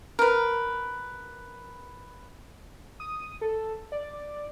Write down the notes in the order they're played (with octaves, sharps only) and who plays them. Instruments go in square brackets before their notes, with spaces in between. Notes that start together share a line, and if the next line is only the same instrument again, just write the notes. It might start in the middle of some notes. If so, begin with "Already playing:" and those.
[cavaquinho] A#4 B4
[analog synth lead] D#6
A4
D5